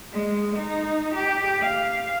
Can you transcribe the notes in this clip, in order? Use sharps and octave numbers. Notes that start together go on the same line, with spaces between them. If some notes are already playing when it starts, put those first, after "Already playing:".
G#3
D#4
G4
F5